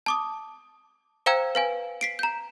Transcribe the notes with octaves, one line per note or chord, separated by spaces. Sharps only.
A5 D6 D#6
C5 F5 G5 A#5 E6 G#6
B4 F5 G#5
B6 C7 D7
A#5 G6